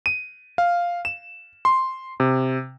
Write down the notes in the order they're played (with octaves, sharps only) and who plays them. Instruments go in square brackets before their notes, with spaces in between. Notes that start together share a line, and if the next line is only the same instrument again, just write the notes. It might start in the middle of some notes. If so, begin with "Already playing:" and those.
[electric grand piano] D#7
F5
E7
C6
C3